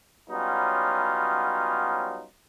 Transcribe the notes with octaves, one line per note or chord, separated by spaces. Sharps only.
F#3 G3 B3 C#4 D#4 F4